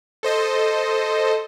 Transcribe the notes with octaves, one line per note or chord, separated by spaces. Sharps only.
A4 C5 D#5